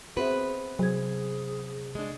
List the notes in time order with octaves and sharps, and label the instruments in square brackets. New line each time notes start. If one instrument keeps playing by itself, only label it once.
[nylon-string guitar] B3 F#4 B4 [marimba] C4 C5 E5 [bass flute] G#4
[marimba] C3 G#6 [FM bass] F#3 [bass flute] G#4
[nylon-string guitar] G#3 D4